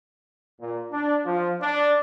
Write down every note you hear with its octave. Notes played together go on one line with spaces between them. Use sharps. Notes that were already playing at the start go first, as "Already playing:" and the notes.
A#2
D4
F3
D4